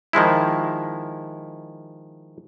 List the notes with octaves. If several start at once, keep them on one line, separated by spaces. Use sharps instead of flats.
D#3 F3 G#3 E4